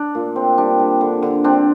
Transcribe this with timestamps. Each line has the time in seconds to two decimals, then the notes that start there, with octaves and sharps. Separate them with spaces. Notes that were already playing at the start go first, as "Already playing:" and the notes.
Already playing: D4
0.15 A#2
0.36 C4
0.58 G3 D4
0.79 G3
1.01 D3
1.23 D3
1.44 C4 D4